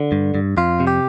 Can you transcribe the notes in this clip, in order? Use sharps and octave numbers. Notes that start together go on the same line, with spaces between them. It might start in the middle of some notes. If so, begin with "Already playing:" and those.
Already playing: D3
G2
G2
F2 F4
C3
G4